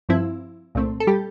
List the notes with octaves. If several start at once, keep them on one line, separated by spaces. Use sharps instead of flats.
G2 F3 C4 E4
C2 A#2 A3 C4
A4
G3 G4